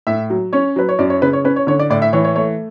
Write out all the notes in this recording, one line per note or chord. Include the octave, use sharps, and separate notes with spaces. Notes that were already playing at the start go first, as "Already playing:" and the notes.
A2 E5
F#3
C#4 C#5
F#3 B4
C#5
F#2 D5
C#5
C#3 B4
C#5
C#4 B4
C#5
D3 C#5
D5
A2 D5
E5
E3 C#5
C#5
A3 C#5